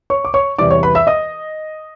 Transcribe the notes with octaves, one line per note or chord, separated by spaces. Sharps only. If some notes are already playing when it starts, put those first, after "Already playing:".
C#5 C#6
D6
C#5 C#6
E2 C3 E3 G3 D5 D6
C#5 C#6
B4 B5
E5 E6
D#5 D#6